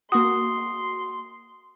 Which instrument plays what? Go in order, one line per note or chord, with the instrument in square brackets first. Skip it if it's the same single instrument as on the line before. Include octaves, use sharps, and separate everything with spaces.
[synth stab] A#3 F#4 [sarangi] C6 [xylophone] D#6